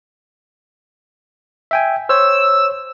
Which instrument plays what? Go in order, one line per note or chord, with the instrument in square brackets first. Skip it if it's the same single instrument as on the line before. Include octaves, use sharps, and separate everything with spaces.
[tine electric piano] E5 G5 G#5
[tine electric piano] C5 C#5 [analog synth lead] E6